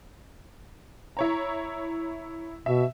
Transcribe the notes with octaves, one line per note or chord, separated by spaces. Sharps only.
E4 C#5 A#5
B2 E5